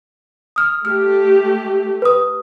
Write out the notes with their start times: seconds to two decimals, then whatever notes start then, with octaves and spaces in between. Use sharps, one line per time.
0.56 D#6 F6
0.85 A3 G4 F6
2.02 B4 D#6